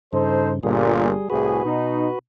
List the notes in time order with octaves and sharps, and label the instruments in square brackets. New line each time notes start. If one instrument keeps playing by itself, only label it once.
[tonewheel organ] G2 C#3 [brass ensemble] D#4 A4 C5
[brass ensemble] G1 A#2 [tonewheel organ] G3 G#4
[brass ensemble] C2 A2 G#4 [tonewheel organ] F#4 B4
[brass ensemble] B2 D#4